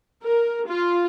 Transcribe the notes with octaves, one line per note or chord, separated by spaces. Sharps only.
A#4
F4